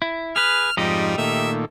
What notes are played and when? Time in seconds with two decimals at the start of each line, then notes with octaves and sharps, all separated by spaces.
0.02 E4
0.36 G#4 B4 F6
0.77 F2 G#2 F3 G3 D#4 G4 D#5
1.18 A#2 D#3 A3 E5